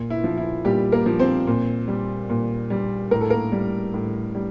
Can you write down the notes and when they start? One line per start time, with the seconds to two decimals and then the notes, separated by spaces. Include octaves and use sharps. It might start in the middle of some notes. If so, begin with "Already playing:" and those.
Already playing: A#2
0.10 E4
0.24 F3
0.38 E4
0.65 A#2 G3 G4
0.92 A#3 A#4
1.06 F3
1.19 C4 C5
1.47 A#2
1.88 G3
2.30 A#2
2.70 G3
3.11 A2 A#4
3.21 A4
3.30 A#3 A#4
3.52 G3
3.94 A2
4.35 G3